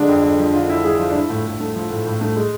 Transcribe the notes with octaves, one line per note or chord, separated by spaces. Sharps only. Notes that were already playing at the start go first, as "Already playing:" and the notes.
Already playing: D3 G#3 D4
F2
F2
F3
D3 F4
F2 E4
F2 G#4
F3 F4
D4
F3 E4
A2
A2
A3
F3
A2
A2
A3
G#3